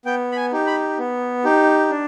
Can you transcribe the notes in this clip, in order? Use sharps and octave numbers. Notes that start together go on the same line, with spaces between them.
B3 G5
B5
G#5
D#4 G4
B5
B3
D#4 G4
D4